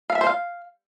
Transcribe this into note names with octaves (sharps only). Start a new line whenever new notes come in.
F5
E5
C5
F5